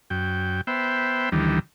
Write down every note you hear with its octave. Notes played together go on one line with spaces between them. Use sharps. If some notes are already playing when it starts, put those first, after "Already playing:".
F#2 G5
B3 C5 E5 G5
D2 D#3 E3 G3